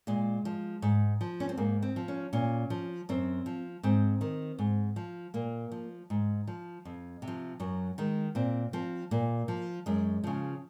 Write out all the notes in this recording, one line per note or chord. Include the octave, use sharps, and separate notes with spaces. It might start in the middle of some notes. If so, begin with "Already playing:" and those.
A#2 G#3
F3
G#2
F3
C#4
C4
G#2 A#3
C4
F3
C#4
A#2 C#4
F3
F#2 C4
F3
G#2 C4
D#3
G#2
F3
A#2 A#3
F3
G#2
F3
F2
C3
F3
F#2 F#3
D#3 G#3
A#2 C4
F3 C4
A#2 A#3
F3
F#2 G#3
C#3 F3